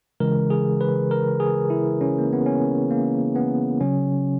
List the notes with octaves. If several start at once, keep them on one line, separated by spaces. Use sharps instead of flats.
C#3 E3 G#3 A#4
G#4
B4
A#4
G#4
E4
C#4
A#3
B3
C#4
A#3
B3
C#3 F#3 C#4